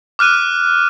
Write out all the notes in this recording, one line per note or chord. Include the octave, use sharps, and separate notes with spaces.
D6 F6 F#6 D#7